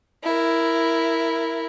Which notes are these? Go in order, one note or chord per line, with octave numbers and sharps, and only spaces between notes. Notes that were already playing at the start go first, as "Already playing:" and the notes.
E4 A#4